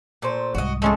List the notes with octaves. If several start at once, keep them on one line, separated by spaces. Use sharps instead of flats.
A#2 A3 C5
C2 G#2 F#4 D#5
F3 G#3 A3 C#4 G#4 A4